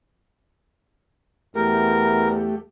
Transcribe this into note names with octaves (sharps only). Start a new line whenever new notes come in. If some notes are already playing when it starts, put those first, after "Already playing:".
E2 A3 G4 A#4